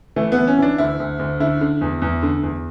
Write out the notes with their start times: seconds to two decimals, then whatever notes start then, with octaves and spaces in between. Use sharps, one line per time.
0.16 E3 A3
0.32 B3
0.38 E3
0.47 C#4
0.58 E3 D4
0.78 D2 E4
1.00 D2
1.19 D2
1.40 D3 E4
1.61 D3
1.81 E2
2.02 E2
2.23 D3
2.43 E2